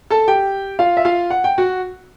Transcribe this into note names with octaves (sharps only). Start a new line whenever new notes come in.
A4 A5
G4 G5
F4 F5
E5
F4 F5
F#5
G5
F#4 F#5